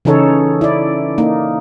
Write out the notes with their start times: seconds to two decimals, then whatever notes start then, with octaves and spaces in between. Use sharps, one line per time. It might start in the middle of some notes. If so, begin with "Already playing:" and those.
0.05 C#3 E3 C#4 D#4 A4 C#5
0.61 E4 D5
1.18 A#3 D#4